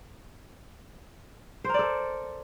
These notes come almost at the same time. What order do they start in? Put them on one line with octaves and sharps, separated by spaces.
C5 A#4 D5 A4